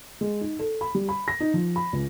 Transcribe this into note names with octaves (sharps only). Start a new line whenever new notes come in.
G#3
D#4
A4
B5
G3
B5
A#6
D#4
F3
B5
C#2